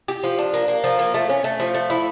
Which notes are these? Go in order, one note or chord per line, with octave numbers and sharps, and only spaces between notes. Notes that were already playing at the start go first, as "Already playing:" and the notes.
G4
F3
D4
A#3
A#3
F3
A#3
A3
C#4
A3
F3
A3
E4